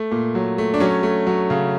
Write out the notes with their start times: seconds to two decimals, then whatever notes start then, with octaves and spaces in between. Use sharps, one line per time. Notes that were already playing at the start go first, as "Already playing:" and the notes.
Already playing: A3
0.11 A#2
0.35 F#3
0.58 A3
0.74 D4
0.80 F#3 C#4
1.03 A3
1.27 F#3
1.50 C#3